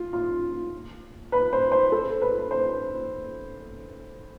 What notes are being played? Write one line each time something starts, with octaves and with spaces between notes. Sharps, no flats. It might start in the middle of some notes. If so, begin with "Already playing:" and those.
Already playing: F4
F4
B4
C5
C5
A4
B4
C5